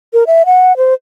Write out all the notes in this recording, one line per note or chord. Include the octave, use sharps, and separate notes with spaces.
A#4
E5
F#5
C5